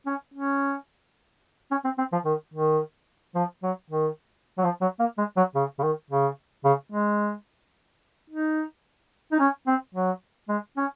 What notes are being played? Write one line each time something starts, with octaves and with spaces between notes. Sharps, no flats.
C#4
C#4
C#4
C4
C4
F3
D#3
D#3
F3
F#3
D#3
F#3
F3
F#3
A#3
G#3
F#3
C#3
C#3
D#3
C#3
C#3
G#3
D#4
D#4
C#4
C4
F#3
G#3
C#4